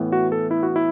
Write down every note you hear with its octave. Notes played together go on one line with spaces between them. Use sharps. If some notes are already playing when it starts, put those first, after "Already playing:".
Already playing: A2 E3 B3
F#4
A4
E4
F#4
E4